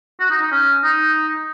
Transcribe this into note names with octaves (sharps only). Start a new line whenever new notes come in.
F#4
D#4
D#4
C#4
D#4